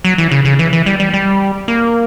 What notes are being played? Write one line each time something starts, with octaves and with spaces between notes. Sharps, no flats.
F#3
E3
C#3
C#3
E3
E3
G3
G3
G3
A#3